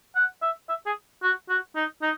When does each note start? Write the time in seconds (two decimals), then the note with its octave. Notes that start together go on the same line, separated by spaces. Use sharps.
0.16 F#5
0.42 E5
0.69 E5
0.86 G#4
1.23 F#4
1.49 F#4
1.76 D#4
2.02 D#4